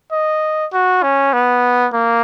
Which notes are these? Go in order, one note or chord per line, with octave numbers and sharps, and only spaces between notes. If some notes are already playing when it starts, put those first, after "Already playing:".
D#5
F#4
C#4
B3
A#3